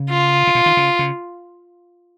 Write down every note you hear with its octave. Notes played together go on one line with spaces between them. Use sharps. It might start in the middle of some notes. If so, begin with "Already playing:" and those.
Already playing: C#3
F4
C#3
B2
D#3
C#3
C#3